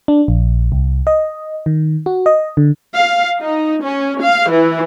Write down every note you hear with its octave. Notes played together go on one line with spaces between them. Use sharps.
D4
A#1
C2
D#5
D#3
F#4
D#5
D3
F5
D#4
C#4
F5
E3